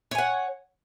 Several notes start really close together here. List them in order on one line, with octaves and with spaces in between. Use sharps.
C#5 G#5 F#5